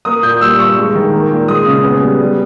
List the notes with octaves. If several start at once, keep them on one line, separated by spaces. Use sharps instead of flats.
A#3 D#6
A#2 G6
G3 E6
G2 C#6
G#3
D#3
A#3
A#2
G#3 D#6
C#3
B3
G3
G3